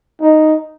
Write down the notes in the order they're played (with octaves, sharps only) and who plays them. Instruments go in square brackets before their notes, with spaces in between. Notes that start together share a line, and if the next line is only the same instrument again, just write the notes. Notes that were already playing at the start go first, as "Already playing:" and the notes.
[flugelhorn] D#4